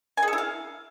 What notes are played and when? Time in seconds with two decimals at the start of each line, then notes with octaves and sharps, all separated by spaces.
0.17 G#5
0.23 G#4
0.28 A4
0.33 E4
0.38 F5